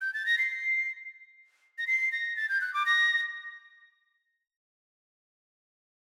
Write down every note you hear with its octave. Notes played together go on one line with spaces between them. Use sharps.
G6
A6
A#6
C7
A#6
C7
A#6
A6
G6
F#6
D6
A#6